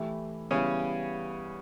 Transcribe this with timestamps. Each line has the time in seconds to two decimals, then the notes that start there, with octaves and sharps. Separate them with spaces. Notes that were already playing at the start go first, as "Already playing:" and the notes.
Already playing: E3 A3 E4 G4
0.51 C#3 E3 G3 B3 C#4